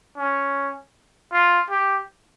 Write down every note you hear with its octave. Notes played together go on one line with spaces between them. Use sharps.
C#4
F4
G4